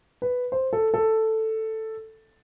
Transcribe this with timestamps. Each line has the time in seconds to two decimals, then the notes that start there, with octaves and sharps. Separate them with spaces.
0.22 B4
0.52 C5
0.73 A4
0.94 A4